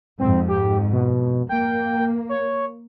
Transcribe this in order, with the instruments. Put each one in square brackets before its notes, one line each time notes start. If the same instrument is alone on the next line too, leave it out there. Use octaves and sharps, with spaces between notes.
[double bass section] F2 G#2 [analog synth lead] C4
[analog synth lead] G4
B2
[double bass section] A#3 [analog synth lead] G5
[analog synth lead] C#5